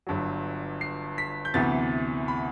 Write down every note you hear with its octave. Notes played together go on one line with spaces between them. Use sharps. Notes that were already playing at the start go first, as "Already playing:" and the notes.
G1 G2 F#3
C7
B6
G6
D2 C3 E3 B3 A6
B5